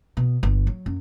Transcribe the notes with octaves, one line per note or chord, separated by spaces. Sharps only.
B2
G1
F#3
F#2